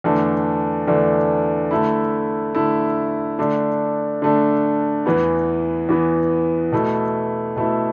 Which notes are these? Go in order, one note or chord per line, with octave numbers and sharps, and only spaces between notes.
E2 D3 A3 D4
E2 D3 A3 D4
D3 A3 E4
D3 A3 E4
D3 A3 D4
D3 A3 D4
E2 E3 B3
E2 E3 B3
B2 A3 E4
B2 A3 E4